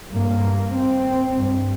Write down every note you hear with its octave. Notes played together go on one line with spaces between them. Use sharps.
G2 A#3
C4
G2